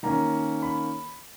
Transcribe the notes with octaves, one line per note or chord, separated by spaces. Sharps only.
D#3 A#3 C#4 A#5
B5